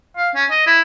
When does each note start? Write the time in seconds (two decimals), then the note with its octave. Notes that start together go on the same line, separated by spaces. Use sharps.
0.17 F5
0.35 C#4
0.51 D#5
0.66 E4